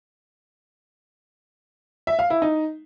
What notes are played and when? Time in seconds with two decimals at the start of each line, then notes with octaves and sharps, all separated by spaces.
2.07 E5
2.19 F5
2.30 E4
2.42 D#4